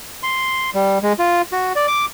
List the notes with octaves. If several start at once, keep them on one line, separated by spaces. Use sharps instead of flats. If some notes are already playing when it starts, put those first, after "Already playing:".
C6
G3
G#3
F4
F#4
D5
D6